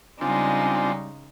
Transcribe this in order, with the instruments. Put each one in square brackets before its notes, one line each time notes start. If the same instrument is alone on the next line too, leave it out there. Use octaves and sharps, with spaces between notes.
[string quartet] C#3 G#3 D#4 [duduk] G3 [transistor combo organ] C4 D4 F4 [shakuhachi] G#5